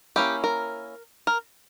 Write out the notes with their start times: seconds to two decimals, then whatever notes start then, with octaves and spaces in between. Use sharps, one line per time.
0.16 A#3 C#4 E4 G4
0.44 A#4
1.27 A#4